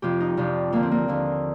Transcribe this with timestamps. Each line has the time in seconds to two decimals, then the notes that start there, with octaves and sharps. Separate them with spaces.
0.02 F2 C3 F3 G4
0.20 D#4
0.37 F2 C3 F3 D4
0.72 D#2 D3 F3 A#3
0.83 C4
0.91 A#3
1.08 D#2 D3 F3